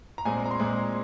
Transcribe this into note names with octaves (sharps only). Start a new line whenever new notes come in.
A#5
A#2 G#3 C4 G#5
A#5
C6
A#2 G#3 C4